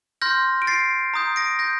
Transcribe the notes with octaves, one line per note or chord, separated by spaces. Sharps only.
C6 F6 G6 A#6
D7
A6 C7
A#5 D#6 G6
A#6 D7
G6 A#6